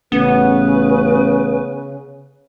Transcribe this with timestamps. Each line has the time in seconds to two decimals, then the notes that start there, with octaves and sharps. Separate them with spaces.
0.12 A1 C#3 B3 B4